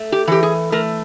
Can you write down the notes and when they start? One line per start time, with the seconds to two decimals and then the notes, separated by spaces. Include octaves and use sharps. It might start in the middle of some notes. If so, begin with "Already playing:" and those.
Already playing: A3
0.12 G4
0.27 E3 G4
0.43 G#4
0.72 A3 A#4